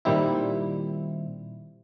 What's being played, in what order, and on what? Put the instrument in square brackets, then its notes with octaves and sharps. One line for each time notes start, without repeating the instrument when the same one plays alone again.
[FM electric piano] A#2 D#3 G3 C4 E4